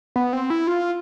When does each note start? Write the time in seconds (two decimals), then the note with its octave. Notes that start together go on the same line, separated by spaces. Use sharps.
0.16 B3
0.33 C4
0.50 E4
0.67 F4